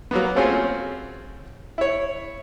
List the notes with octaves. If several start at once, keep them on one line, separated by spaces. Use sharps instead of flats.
F#3 A#3 B3
A3 C4 C#4 F4 F#4 G#4
E4 C#5